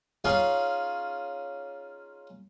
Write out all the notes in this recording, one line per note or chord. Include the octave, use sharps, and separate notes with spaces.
C#4 D#4 F4 G#4